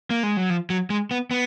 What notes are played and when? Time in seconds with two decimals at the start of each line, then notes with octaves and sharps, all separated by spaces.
0.10 A#3
0.23 G#3
0.37 F#3
0.50 F3
0.70 F#3
0.90 G#3
1.11 B3
1.31 B3